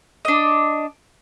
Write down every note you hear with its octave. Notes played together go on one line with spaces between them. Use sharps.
D4 D#5